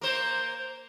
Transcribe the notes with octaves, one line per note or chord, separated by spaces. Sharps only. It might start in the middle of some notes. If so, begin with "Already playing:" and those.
A#3 C5